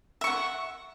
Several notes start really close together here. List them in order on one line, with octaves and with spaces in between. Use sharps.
E5 C#6 F#5